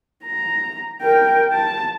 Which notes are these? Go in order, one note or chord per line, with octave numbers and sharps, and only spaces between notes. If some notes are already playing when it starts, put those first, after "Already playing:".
A#5
A#4 G5
A5